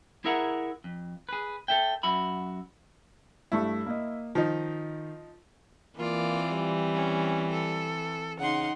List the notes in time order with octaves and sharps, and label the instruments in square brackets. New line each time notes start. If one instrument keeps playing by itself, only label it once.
[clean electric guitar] E4 G#4 A#4 E5 F#5 A#5
F2
G#4 B4
A4 E5 G5
F#2 F#4 E5 B5
[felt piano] G2 A3 C#6 [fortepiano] E4
[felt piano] A#3 D#5
[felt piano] D#3 [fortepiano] F3 D#4
[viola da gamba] E3 C4 [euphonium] A#3 [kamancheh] F4 D5
[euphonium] G3
[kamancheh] C#4
A4
[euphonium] C#3 [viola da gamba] D#4 [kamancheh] F#5 C6